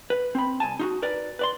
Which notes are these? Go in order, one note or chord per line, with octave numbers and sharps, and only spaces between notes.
B4
C4 B5
C2 G#5 A5
D#4 F4 F#4
A#4 B4 D5
B4 D5 C6